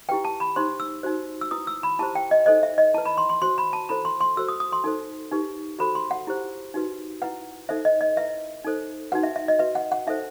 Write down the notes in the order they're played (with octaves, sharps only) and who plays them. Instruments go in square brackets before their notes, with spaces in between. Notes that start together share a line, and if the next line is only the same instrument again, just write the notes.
[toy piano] E4 G4 B4 G5
A5
B5
D#4 G4 C5 C6
E6
D#4 F#4 C5
E6
E4 B4 D#6
E6
B5
E4 G4 C5 A5
G5
D#5
D#4 A4 C5 D#5
E5
D#5
E4 B4 A5
B5
C6
C6
F#4 C5 C6
B5
A5
E4 A4 C5 B5
C6
C6
F#4 A4 C5 E6
D#6
D#6
C6
D#4 A4 C5
D#4 G4 B4
F#4 A4 C5 B5
C6
F#5
E4 G4 C5
D#4 F#4 B4
E4 B4 F#5
D#4 A4 C5 E5
D#5
D#5
E4 B4 E5
D#4 A4 C5
D#4 F#4 B4 F#5
E5
E5
D#5
F#4 B4 E5
F#5
F#5
D#4 A4 C5 E5